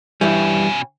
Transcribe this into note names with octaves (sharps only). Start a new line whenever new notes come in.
G2 B2 E3 G3 C#4